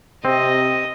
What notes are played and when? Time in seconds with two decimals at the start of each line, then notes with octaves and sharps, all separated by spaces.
0.25 C3 C4 D#5